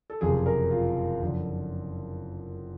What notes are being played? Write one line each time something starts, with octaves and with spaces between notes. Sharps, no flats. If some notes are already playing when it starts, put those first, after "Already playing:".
A4
F#1 F2 C3 G#4
A#4
F4
F#1 F2 D3